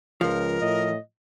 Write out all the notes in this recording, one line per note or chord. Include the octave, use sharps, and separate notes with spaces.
C#2 F3 A#4
A2 D#5